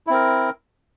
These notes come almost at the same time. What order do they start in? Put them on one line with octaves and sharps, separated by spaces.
E4 C4 A#4